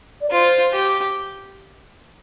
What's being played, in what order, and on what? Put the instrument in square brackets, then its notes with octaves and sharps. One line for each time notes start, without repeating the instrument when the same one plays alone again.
[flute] D5
[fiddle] F4 [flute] C5
[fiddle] G4